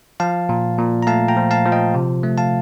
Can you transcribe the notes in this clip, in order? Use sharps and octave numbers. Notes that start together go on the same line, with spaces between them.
F3 F5 A5
A#2
A#2
A#5
A3 F5 A5
G5 A#5
F3
F5 A5
F3
D#5 G5
C3
A3
F5 A5